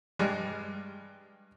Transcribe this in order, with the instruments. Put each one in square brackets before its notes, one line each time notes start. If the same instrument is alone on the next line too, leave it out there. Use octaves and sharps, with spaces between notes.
[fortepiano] G2 G3 G#3